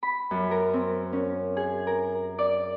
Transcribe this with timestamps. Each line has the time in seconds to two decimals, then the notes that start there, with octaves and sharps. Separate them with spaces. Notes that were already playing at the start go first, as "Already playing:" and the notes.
0.03 B5
0.31 F#2
0.51 A#4
0.74 C4
1.12 C#4
1.57 G#4
1.87 A#4
2.39 D5